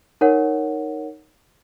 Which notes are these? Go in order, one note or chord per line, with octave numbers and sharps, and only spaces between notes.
D#4 A#4 C#5 F#5